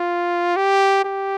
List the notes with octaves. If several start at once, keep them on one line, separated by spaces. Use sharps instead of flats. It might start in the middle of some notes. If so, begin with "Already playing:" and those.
Already playing: F4
G4
G4